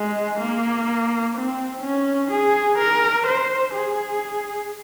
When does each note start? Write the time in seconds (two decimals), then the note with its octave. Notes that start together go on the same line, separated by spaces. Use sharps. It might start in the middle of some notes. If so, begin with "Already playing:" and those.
Already playing: G#3
0.40 A#3
1.35 C4
1.83 C#4
2.31 G#4
2.78 A#4
3.27 C5
3.74 G#4